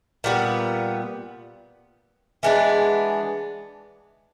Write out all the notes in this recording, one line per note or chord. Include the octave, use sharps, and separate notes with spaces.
A#2 G3 B3
E3 G#3 B3 D4